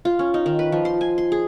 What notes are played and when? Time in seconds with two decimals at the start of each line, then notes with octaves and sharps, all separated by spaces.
0.05 F4
0.19 C#4
0.34 D#4
0.46 D#3
0.59 B4
0.72 F3
0.85 C6
1.01 G#5
1.18 C6
1.32 G#4